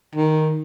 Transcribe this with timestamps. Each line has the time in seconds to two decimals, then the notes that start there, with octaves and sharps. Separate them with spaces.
0.15 D#3